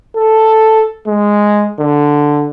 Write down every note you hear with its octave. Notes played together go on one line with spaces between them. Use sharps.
A4
G#3
D3